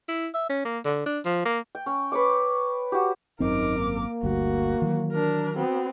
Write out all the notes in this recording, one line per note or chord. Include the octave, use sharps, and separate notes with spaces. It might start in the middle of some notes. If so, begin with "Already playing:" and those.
E4
E5
C#4
A#3
D3
D4
F3
A#3
G5
C#4
B4 C#5 D6
F#4 G4
G#1 F#2 C4 D#4 A#4 D6
A#3
G1 D2 G3 F#4
D#3 E3 F#3
D4 A#4
B3 C4 F#4